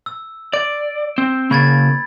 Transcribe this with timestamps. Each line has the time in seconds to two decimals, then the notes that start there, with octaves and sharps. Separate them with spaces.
0.06 E6
0.53 D5 D7
1.18 C4
1.51 C#3 A#3 B5 G#6 A6